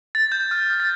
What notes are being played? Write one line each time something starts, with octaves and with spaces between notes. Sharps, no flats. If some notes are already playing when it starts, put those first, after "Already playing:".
A6
G6
F6
A6